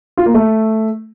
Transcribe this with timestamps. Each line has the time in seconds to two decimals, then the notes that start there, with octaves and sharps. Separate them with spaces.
0.17 F4
0.26 A#3
0.34 A3